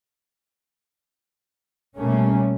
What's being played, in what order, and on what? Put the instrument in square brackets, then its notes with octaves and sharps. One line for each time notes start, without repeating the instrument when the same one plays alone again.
[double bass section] B2 G3 A3 A#3 C#4